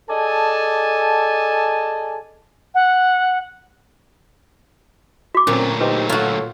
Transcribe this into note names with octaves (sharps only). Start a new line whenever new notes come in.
G#4 A4 D5 D#5 G#5 A5
F#5
F#4 D6
D2 A#2 F#3 C4 C#4
D#4 G4 B4 C5
F4 F#4 A4 C#5